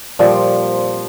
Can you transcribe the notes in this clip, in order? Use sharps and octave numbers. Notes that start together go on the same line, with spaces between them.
A#2 F3 G3 C4